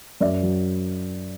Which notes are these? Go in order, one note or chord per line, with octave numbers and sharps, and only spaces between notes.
F#2 D5 E5
F#3